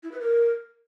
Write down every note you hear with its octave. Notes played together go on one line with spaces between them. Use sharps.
E4
B4
A#4